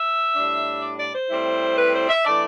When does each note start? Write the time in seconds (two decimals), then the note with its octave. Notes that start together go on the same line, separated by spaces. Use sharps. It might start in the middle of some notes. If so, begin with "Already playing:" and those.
Already playing: E5
0.33 A2 G3 D4
0.81 D5
0.98 D5
1.13 C5
1.30 A2 G3 C4 E4
1.77 B4
1.93 C5
2.09 E5
2.25 E3 A3 D4 D5